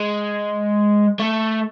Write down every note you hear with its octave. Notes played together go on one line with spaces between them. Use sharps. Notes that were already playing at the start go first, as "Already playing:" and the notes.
Already playing: G#3
A3